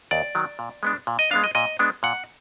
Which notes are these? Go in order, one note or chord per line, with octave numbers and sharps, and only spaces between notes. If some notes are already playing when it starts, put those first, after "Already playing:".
D#2 D5
D#3 F#3
A#2
G#3 B3 D4
A#2
D#5
G#3 B3 D4 F5
D#5
A#2 D#5
G#3 B3 D4
A#2 F#5